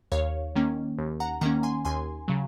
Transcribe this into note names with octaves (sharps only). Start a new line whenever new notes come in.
D#2 C#5 F5
D#3 A#3 C#4
D#2
F#5 A#5
D#3 A#3 C#4 F#5 A#5
G#5 C6
D#2 G#5 C6
C#3 F#3